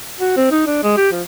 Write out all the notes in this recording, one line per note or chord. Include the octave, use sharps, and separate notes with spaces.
F#4
C4
D#4
D4
G#3
G4
F3